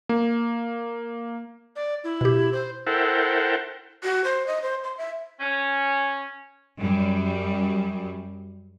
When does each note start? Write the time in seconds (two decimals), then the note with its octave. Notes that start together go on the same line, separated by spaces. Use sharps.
0.09 A#3
1.76 D5
2.04 E4
2.21 B2 G4
2.53 C5
2.87 E4 A4 A#4 C5 F#5 G5
4.03 F#4
4.24 C5
4.47 D#5
4.62 C5
4.84 C6
4.97 E5
5.40 C#4
6.80 F#2 G3